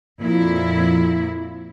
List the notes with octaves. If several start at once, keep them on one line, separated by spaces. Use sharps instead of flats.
F2 A#2 E4